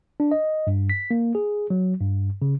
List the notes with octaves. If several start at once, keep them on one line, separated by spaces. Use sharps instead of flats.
D4
D#5
G2
B6
A#3
G#4
F#3
G2
C#3